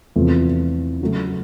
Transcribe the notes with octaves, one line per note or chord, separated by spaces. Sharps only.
E2 C3 F3 A3
C#3 F#3 A3